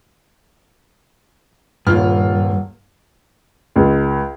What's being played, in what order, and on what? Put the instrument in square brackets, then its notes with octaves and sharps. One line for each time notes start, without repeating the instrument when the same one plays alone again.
[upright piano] D#1 F4 F6 [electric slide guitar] G2
[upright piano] C#2